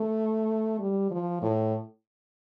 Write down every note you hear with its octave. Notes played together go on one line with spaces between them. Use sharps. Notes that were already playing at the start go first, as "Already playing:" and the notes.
Already playing: A3
G3
F3
A2